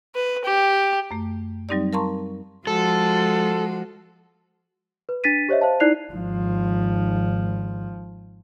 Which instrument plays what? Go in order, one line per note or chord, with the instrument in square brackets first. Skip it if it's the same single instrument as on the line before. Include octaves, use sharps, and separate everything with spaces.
[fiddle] B4
G4
[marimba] F#2 A3
F#3 G3 C4 D#4 G4 D5
A#4 F5 A5 A#5 C6 C#6
[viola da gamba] F3 G#3 F#4 [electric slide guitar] A4
[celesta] B4
D4 A6 B6 D#7
G4 C5 C#5 D#5 E5
C5 F5 A5
D#4 E4 D5 F#6 C7 F7
[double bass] G#1 F3